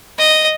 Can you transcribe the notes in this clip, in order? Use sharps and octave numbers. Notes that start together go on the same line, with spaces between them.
D#5